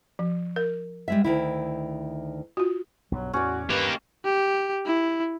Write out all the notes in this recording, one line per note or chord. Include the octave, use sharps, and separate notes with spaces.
F3
A#4
G3 G#3 E5
D2 D#3 E4
F4 F#4
B1 G2 F#3
E2 A2 C#4 F#4 D5
G2 A#3 G4 B4
G4
E4